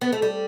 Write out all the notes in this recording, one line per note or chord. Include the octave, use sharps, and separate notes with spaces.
B3
A3
G3